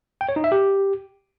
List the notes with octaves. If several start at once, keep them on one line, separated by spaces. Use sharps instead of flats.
G5
C#5
D#4
E5
G4